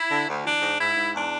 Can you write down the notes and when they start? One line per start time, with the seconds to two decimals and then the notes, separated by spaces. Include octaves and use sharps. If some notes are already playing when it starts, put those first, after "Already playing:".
Already playing: E4
0.10 D3
0.27 D2
0.44 E3 D4
0.61 G#2
0.78 G#2 E4
0.96 G#2
1.14 E2 D4